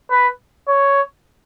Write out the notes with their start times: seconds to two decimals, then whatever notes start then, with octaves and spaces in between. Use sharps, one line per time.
0.11 B4
0.68 C#5